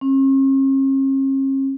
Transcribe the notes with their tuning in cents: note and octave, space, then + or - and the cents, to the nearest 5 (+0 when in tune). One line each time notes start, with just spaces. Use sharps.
C#4 -45